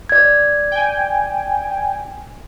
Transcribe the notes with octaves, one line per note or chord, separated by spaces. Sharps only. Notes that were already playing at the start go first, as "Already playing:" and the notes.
D5 G#6
G5 G#5